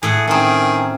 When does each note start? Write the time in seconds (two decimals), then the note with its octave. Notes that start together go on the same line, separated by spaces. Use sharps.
0.03 A2 G#4 A4 F#5
0.27 D#3 C4 C#4 G#4